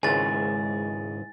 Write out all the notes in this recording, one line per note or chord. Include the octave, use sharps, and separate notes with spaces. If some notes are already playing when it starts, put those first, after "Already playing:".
G#1 C#2 G#2 E4 G#4 G#5 A6